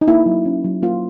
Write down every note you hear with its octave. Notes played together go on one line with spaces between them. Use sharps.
D#4
A#3 E4
F#3
C#4
F#3
A#3 F4